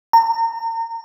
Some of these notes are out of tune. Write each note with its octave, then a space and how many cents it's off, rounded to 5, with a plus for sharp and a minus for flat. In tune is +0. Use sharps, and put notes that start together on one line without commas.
A#5 -35